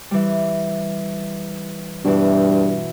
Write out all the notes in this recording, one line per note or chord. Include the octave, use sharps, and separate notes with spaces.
E3 G3
G2 B2 E3